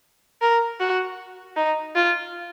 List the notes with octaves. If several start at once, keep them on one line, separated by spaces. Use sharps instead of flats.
A#4
F#4
D#4
F4